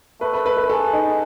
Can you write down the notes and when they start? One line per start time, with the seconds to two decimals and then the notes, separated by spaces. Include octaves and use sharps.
0.21 A3 B4
0.33 B4
0.46 B4
0.57 B4
0.70 G#4 A4
0.93 D#4